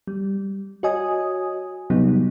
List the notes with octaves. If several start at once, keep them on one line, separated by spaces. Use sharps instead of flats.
G3
F#4 C#5 D#5 G#5 D#6
C3 F#3 G3 B3 D#4